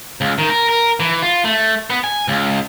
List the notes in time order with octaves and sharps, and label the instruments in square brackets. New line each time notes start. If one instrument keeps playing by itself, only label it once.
[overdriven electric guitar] C#2
D#3
A#4
A#4
E3
F4
A3
B3
G#5
C#2